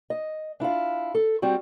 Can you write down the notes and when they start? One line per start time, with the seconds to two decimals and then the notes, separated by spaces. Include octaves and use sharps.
0.10 D#5
0.60 D4 E4 F4 F5
1.15 A4
1.42 G3 C4 F#4